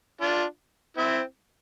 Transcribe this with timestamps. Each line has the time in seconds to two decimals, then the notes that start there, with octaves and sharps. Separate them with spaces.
0.21 D4 F4
0.97 C4 E4